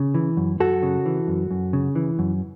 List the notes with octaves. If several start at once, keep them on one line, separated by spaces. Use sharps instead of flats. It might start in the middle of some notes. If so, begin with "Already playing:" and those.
Already playing: C#3
E3
F#2
F#2 F#4 A4
C#3
E3
F#2
F#2
C#3
E3
F#2